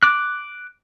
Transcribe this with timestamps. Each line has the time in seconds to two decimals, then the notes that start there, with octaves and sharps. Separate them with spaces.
0.03 D6 F#6